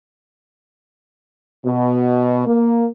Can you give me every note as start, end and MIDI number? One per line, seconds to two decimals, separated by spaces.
1.65 2.44 47
2.46 2.86 58